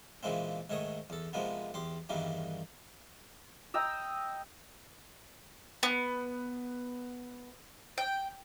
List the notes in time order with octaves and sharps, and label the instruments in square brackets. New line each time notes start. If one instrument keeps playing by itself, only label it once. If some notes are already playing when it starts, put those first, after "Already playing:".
[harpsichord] A#2 C#3 E3 G#3 A#3 C4
G#2 D#3 A3 C#5 D#6
E2 A4
C3 F3 G#3 A#3 B3
E2 G4 C6
E2 G2 D#3 E3 G3 A#3
[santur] D#5 G5 A#5 E6
[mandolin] B3
G5